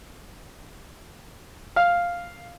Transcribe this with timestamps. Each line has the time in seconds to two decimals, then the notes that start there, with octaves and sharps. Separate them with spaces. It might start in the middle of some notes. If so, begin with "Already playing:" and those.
1.76 F5